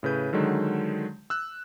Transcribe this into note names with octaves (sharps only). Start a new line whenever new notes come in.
A2 C#3 B4 G6
D3 D#3 F#3 G#3
E6 F#6